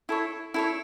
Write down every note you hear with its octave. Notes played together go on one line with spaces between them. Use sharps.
E4 A4 C#5
E4 A4 C#5